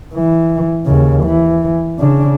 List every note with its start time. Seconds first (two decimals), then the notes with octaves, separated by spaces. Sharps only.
0.15 E3
0.86 D#2 C#3
1.23 E3
1.99 C#3 D4